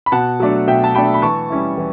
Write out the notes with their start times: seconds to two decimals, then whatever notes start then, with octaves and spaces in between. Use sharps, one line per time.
0.06 B5
0.12 B2 F#5 A5
0.40 F#3 A3 D4
0.67 B2 E5 G5
0.84 A5
0.95 F#3 A3 D4 G5 B5
1.14 B5
1.22 E3 A5 C#6
1.50 G3 C#4 E4
1.78 E3